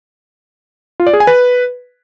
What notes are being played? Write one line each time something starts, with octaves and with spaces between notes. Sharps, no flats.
F4
D5
G#4
G#5
B4